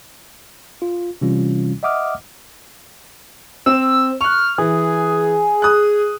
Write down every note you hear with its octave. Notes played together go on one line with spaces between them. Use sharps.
F4
C3 E3 G3 C#4 F4
D#5 E5 F#5 D6 D#6 F6
C4 E6
C#6 F6 F#6
E3 G#4
D#6 F#6